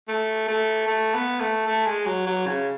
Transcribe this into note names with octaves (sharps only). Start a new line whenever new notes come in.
A3
A3
A3
B3
A3
A3
G#3
F#3
F#3
C#3